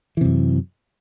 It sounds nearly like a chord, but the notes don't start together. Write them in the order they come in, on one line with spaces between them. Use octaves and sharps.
E3 C3 F#2